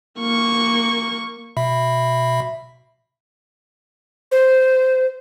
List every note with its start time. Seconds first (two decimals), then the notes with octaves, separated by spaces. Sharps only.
0.20 A#3 C#6
1.57 B2 E5 B5
4.32 C5